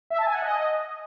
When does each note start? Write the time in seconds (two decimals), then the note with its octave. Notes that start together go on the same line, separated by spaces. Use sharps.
0.10 E5
0.18 A5
0.26 G#5
0.34 F#5
0.42 D#5